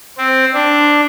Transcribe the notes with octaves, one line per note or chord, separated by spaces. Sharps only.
C4
D4